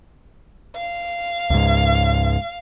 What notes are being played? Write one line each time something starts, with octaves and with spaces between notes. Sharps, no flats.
F5
C#2 G#2